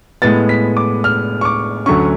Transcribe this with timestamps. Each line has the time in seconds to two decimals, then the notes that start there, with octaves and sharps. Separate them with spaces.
0.22 A2 G#3 B3 A6
0.49 B6
0.77 D6
1.04 F6
1.41 C#6
1.45 D6
1.86 D2 D3 F#3 A3 C#4 C#6